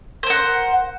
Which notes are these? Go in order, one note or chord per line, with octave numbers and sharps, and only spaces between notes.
A#4 C5 F#5